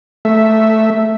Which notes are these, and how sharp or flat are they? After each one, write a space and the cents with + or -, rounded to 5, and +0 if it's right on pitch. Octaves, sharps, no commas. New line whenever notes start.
A3 +0 E5 +0